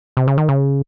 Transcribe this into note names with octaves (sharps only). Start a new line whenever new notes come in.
C3
C#3
D#3
C#3